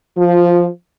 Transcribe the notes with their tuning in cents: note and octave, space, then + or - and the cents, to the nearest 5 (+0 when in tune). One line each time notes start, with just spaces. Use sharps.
F3 +0 F4 +25